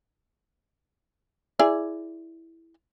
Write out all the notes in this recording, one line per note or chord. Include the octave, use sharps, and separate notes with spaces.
E4 G#4 D5